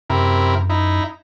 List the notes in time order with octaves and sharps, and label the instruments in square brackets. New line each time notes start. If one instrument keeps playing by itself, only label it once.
[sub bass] F#2 [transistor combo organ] C3 E4 A#4
[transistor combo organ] D#4 E4